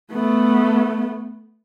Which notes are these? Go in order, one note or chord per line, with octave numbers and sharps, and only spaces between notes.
A3 B3